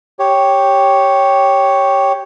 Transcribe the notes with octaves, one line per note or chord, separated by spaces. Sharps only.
G4 C#5